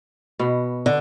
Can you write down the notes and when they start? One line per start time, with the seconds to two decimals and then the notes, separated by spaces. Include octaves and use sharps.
0.39 B2 B3
0.86 D3